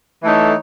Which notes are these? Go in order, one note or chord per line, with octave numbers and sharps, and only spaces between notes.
E3 A3 D#4 A4 C#5